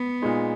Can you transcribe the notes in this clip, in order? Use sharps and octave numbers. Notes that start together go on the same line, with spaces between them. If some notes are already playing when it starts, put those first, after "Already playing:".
Already playing: B3
A#2 G#3 D#4